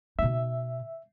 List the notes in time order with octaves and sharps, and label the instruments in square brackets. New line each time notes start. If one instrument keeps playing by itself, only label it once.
[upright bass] B2 D#4 [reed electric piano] E5